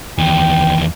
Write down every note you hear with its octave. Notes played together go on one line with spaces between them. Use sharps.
E2 D#3 G5